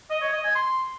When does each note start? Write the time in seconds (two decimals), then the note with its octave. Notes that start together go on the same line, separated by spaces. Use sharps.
0.11 D#5
0.22 C#5
0.33 D#5
0.44 G#5
0.55 C6